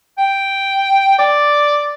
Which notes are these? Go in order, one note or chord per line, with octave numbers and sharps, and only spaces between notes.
G5
D5